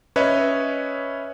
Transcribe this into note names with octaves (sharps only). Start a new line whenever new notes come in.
C#4 B4 C#5 D#5 E5